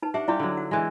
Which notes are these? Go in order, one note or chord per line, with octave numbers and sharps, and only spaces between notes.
D#4 B4 A5
D4 G4 E5 F#5
G3 D4 E4 F4 G4 D5
D3 F#3
F#5
E3 G#3